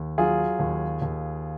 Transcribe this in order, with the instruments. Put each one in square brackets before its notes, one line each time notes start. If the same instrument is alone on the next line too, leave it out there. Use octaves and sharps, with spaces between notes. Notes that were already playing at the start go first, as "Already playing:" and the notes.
Already playing: [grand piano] D#2
F#3 F4 G#4
D#2
D#2